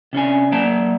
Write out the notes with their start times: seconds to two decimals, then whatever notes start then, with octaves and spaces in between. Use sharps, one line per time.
0.13 C3 C#4 D4 G#5
0.52 F#3 A#3 D5 A5